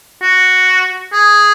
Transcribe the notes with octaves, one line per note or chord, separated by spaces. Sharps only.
F#4
G#4